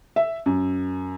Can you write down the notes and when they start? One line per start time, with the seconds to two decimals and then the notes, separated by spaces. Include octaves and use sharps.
0.16 E5
0.46 F#2